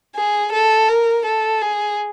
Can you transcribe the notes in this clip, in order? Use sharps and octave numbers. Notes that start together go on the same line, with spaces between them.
G#4
A4
A#4
A4
G#4